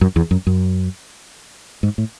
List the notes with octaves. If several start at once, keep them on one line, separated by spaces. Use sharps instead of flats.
F#2
E2
F#2
F#2
G#2
A2